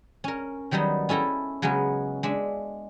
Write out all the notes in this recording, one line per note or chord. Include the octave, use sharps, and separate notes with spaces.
C#4 A#4
D#3 F#3 G3 B3 D#4
C#4 E4 A4 G5 A#5
C#3 F#3 G#3 B3 C#4
G#3 D4 E5